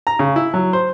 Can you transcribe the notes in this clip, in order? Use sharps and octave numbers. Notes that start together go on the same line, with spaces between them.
A#5
C#3
E4
F#3
C5